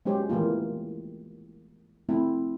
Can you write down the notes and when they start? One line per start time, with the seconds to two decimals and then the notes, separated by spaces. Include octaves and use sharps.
0.05 F#3 G#3 C#4 G4 C5
0.29 E3 A3 A#3 F4
2.09 A3 C4 E4